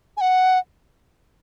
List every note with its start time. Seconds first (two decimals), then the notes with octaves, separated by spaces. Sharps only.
0.17 G#5
0.21 F#5